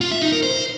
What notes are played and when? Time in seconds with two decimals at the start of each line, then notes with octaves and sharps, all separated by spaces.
0.01 F4
0.11 E5
0.22 D#4
0.32 A#4
0.43 C5